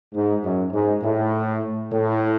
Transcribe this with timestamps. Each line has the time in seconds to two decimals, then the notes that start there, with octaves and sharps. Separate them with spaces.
0.14 G#2
0.44 F#2
0.73 G#2
1.03 A2
1.91 A2